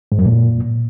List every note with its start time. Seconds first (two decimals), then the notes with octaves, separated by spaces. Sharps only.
0.12 G#2
0.19 F#2
0.26 A#2